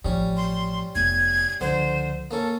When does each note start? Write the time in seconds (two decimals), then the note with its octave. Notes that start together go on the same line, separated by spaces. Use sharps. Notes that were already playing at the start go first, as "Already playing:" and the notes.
0.05 A1 F3 G3 C#4
0.37 C6
0.95 F1 B3 G#6
1.61 C#2 D3 F3 C5
2.31 A#3 C#4 A4